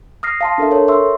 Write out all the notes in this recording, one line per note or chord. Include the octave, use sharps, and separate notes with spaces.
D#6 F6 A#6 C7
F5 A5 C6
D4 A4 A#4 E5
A4 A#4 C#5
E5 C6 C#6 E6